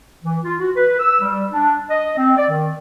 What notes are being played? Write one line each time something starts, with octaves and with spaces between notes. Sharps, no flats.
E3
F4
F#4
B4
E6
G3
D4
D#5
C4
D5
D#3